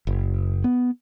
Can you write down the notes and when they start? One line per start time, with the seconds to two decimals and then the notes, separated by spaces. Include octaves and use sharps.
0.07 F#1
0.64 B3